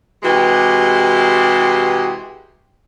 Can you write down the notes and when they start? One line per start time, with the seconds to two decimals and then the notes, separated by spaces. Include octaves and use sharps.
0.23 C3 E3 G#3 F#4 G4